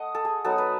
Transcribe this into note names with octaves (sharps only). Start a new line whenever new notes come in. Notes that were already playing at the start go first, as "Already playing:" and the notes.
Already playing: A3 D#5 F#5
A4
G#4
F#3 B3 D#4 A4
B4